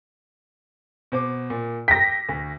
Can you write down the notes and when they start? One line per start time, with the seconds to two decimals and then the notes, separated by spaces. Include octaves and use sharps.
1.12 B2 C5 D6
1.50 A#2
1.88 G5 A#6 B6
2.29 D2